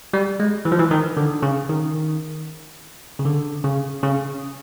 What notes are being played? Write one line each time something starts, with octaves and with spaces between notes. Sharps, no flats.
G3
G#3
E3
F3
E3
D#3
D3
C#3
D#3
C#3
D3
C#3
C#3